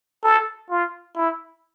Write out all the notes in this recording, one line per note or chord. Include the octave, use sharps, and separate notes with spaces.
A4
F4
E4